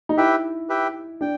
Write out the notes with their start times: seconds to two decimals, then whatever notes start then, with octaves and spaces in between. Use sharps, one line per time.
0.09 D#4
0.17 E4 G4 B4 E5 G5
0.69 G4 B4 E5 G5
1.21 D4 G5